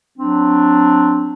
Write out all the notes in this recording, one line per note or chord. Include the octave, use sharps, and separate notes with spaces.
F#3 C4 D4